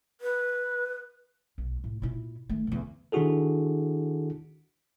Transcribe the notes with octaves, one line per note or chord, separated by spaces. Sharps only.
B4
B1
A2
A#2 E4
D#3 A3
E2 D3
D#3 D4 E4 F#4 G#4 A4